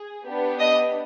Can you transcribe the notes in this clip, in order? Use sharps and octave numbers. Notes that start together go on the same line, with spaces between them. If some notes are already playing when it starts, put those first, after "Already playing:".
Already playing: G#4
B3 D4 G4
D#5 D#6